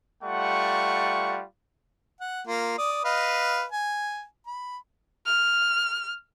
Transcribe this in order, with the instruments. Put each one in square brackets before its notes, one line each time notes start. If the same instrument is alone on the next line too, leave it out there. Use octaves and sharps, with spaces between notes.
[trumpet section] G3 A3 F4 F#5 C#6
[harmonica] F#5
A#3 F4
D5 D#6
B4 D#5 F5
G#5
B5
[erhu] F6